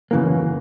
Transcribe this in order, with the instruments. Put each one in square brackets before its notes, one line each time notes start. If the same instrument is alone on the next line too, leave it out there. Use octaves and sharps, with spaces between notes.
[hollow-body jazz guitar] F#2 C#3 E3 A#3